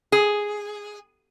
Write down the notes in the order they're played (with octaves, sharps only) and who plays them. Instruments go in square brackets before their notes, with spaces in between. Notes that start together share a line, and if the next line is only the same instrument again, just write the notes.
[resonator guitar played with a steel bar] G#4